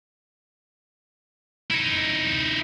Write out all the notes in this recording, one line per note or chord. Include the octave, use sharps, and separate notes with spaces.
D#4 E4